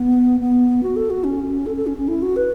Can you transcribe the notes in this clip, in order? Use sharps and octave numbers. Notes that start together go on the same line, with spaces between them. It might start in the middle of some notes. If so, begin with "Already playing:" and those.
Already playing: B3
B3
F#4
A4
F#4
C#4
C#4
A4
A4
C#4
C#4
E4
F#4
B4